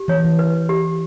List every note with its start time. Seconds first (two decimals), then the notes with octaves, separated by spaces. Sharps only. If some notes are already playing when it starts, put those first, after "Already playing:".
Already playing: G4
0.08 E3 C#5
0.24 E3
0.39 B4
0.69 G4